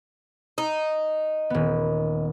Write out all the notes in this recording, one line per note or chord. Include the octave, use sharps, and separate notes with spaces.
D#4
D#1 B3